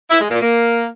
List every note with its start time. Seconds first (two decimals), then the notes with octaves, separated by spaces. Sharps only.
0.10 E4
0.21 G#3
0.31 A#2
0.41 A#3